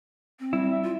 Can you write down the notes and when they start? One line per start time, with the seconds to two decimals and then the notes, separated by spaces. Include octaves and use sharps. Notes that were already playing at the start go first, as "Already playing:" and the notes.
0.40 C4
0.53 G3 E4
0.72 E5
0.83 F4